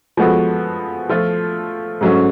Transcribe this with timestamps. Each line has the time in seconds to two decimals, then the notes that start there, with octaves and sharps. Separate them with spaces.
0.17 F3 G#3 B3 F#4 A4
1.09 F3 A3 F4 A4
2.01 G#2 F#3 A3 C#4